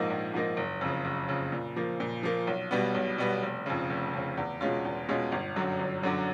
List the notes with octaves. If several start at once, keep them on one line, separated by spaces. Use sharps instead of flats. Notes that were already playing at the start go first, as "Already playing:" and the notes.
Already playing: A#1 G#2 F3 A#3 D#4
A#1
G#2 F3 A#3 D#4
F#1
F2 C#3
F#1
F2 C#3
A#2
F3 A#3
A#2
F3 A#3
B1
B2 G3 B3
B1
B2 G3 B3
F1
F2 C#3
F1
F2 C#3
E2
B2 G#3 C#4 F4
E2
B2 G#3 C#4 F4
G1
F#2 D3 F#3
G1
F#2 D3 F#3